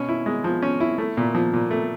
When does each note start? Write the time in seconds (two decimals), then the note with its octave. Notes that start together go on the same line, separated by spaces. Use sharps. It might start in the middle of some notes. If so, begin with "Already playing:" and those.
Already playing: B2 C#4
0.09 E4
0.26 G#3
0.44 F3
0.63 C#4
0.80 E4
0.98 A3
1.17 A#2
1.35 F3
1.53 A#2
1.71 A3